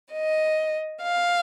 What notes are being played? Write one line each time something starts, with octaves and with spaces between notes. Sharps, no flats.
D#5
F5